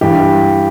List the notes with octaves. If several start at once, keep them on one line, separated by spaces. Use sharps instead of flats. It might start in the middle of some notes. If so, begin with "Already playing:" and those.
G2 E3 G4